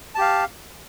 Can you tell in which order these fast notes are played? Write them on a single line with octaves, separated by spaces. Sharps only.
A5 G4 F5